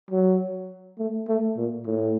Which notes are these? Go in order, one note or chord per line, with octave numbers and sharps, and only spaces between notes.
F#3
A3
A3
A#2
A2